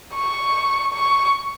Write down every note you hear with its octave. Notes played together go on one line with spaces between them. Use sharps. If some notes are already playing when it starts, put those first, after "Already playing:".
C#6
C#6